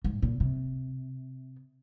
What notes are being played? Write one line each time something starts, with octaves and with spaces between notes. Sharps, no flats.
G#2
A#2
C3